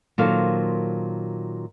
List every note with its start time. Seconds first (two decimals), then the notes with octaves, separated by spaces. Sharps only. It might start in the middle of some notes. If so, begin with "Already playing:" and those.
0.18 A#2 D#3 F#3 A4 C5 F5